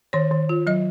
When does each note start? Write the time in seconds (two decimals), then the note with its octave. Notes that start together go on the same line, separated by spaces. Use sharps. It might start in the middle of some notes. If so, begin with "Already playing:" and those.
0.13 D#3 C#5
0.31 D#3
0.49 F4
0.67 F#3 D#5